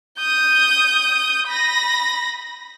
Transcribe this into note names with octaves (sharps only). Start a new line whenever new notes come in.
D#6 G6
B5 A#6